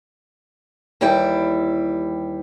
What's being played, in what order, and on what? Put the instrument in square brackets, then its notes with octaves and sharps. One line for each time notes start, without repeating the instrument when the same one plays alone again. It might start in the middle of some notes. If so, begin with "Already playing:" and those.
[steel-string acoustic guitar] D#2 E3 G3 E4 G5